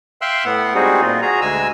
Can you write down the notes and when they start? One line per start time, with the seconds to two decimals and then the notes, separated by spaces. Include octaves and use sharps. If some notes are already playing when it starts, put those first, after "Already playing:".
0.22 E5 F5 G5 C6 E6 F#6
0.45 A2 B3 F#5
0.75 G3 G#3 C4 D#4 F#4 G#4
1.01 A#2 F4
1.22 F#4 G#4 A#5
1.41 D2 G#3 G#5 E6